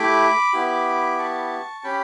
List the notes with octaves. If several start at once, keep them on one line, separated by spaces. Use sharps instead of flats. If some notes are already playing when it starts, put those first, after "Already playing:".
Already playing: A3 E4 G4 B5 D6
B3 E4 G4
A5 C#6
C#4 G4 G5 B5